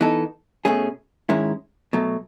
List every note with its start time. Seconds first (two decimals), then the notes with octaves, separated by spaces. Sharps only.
0.01 E3 B3 D#4 A4
0.65 B2 A3 C#4 G#4
1.29 G#2 D#3 G#3 C#4 E4
1.93 B2 F#3 A3